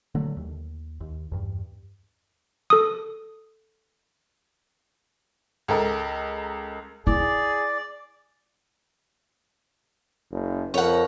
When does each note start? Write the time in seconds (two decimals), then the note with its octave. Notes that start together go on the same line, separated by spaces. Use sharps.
0.15 D3 F#3 A3
0.37 D#2
1.00 D#2
1.32 E2 G2
2.70 A4 D#6
5.68 C#2 A4 A#4
7.07 E4 G#4 D5
10.31 F#1
10.74 F2 A#4 C#5 F#5